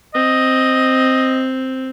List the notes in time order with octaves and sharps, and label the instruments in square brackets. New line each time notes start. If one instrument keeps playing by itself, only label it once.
[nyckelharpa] C4 [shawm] D#5